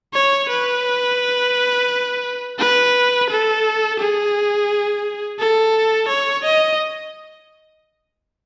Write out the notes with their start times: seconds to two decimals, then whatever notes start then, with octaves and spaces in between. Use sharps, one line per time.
0.14 C#5
0.49 B4
2.59 B4
3.30 A4
3.99 G#4
5.39 A4
6.09 C#5
6.44 D#5